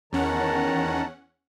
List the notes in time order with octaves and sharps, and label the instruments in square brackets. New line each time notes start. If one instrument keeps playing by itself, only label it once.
[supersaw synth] E2 C#4 F#5 [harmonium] D#3 A5 A#5